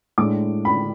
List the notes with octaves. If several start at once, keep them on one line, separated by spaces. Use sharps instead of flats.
A2 G#3 D4 D6
B5